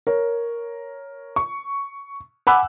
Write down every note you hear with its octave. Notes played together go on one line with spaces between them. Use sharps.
A#4 C#5
C#6
F#5 G#5 B5 D6 E6 F#6